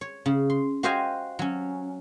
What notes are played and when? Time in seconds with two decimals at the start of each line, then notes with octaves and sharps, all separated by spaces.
0.01 C#5
0.26 C#3
0.50 C6
0.83 F#4 G4 C5 D#5 F5 G#5
1.39 F#3 C#4